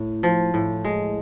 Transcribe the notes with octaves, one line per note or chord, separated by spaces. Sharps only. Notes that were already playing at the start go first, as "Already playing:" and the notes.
Already playing: A2
F3
A2
G#3